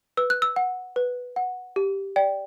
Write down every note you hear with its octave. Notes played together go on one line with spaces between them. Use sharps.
B4 E6
F#6
E6
F#5
B4
F#5
G4
D5 G5